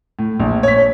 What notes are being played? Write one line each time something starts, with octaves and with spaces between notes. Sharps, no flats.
A2
A#1
C#5 B6